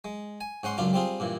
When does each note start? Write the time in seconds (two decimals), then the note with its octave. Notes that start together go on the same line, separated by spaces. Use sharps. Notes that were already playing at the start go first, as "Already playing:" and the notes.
0.04 G#3
0.41 G#5
0.63 G#2 C#4 F#5 C6
0.78 C#2 F#2 D4 F4
0.93 G3 C4 F4 G#4
1.20 G2 A#2 E3